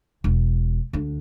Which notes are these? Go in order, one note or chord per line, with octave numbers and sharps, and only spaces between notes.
E1
D2 D4